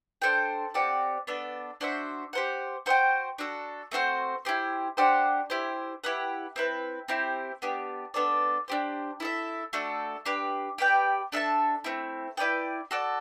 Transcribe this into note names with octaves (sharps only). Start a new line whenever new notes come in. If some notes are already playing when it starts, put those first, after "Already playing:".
D4 A4 C5 G5
C4 G4 D5 F#5
B3 D4 A4 D5
D4 F#4 C5 E5
G4 C5 F#5
F#4 C5 E5 G5
D4 F#4 A4
A3 C4 F#4 C5
E4 G4 C5
D4 G4 C5 F#5
E4 G4 C5
E4 G4 B4 F#5
C4 E4 B4
C4 E4 G4 C5
B3 D4 G4
B3 D4 A4 D5
D4 G4 C5
E4 A4 E5
A3 D4 F#4 A4
D4 G4 B4
G4 B4 D5 G5
D4 A4 E5 A5
A3 C4 E4
E4 B4 D5 G5
F#4 A4 D5